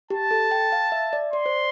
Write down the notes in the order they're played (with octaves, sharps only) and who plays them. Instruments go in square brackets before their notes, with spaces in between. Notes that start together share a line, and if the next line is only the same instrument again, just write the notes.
[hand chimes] G4 [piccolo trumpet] A5
[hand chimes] A4
G5
F5
E5
D5
[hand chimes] D5 [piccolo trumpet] C6
[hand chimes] C5